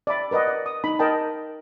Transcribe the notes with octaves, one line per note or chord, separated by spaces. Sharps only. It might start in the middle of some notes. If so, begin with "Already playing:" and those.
D5 E5 B5
A#4 B4 D5 D#5 F#5
D5
D#6
D#4 B5
A#4 D#5 G5 A5